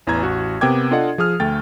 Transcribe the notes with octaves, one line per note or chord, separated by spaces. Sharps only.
A1 E2 E3 A#5 G#6
A1 F#4
C3 B3 A#4 G5 D6 G#6
D4 F4 A4 D5 D#5 F#5
F3 G#4 D#6 F6
D2 A3 G5 A6